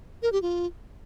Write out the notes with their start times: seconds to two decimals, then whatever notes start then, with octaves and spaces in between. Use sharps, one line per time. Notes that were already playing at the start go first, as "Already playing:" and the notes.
0.22 A#4
0.32 G4
0.42 F4